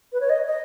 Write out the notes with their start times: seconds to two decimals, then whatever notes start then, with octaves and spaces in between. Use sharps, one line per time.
0.13 B4
0.21 C#5
0.30 D#5
0.46 D#5